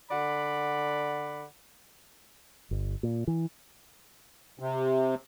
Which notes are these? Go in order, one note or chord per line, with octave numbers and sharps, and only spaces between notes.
D3 D5 F#5 B5
G1
A#2
E3
C3